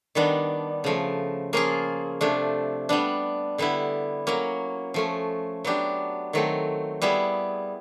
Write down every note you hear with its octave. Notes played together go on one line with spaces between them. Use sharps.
D#3 G3 B3 D4
C#3 F3 A3
F3 A#3 C#4 F4 G#4
C3 F3 A3 D4
G3 B3 D4
D3 G3 B3 E4
F#3 A#3 C#4
F3 A3 C#4
F#3 B3 D4 G4
D#3 F#3 A3 C4
G3 B3 E4 G#4